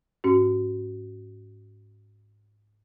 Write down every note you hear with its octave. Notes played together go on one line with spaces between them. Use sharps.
G#2 C#4 F#4